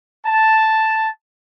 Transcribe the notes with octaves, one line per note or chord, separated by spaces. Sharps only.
A5